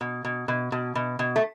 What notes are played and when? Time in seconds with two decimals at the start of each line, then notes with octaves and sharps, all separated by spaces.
0.01 B2
0.25 B2
0.48 B2
0.72 B2
0.95 B2
1.19 B2
1.36 A3